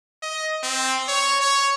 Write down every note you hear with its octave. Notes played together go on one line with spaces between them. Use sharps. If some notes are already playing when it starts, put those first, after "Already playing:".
D#5
C4
C#5
C#5